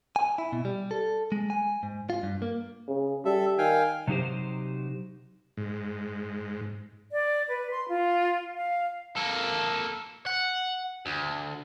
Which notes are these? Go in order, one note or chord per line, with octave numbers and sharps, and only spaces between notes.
G#5
E4
B2
G3
A4
G#3
G#5
G#2
F4
G2
A#3
C#3
G3 A4 E5
D#3 F5 G5 G#5
C3 F#3 D#4 G4 C5
G#2
D5
B4
C6
F4
F5
A#3 A4
F#5
D2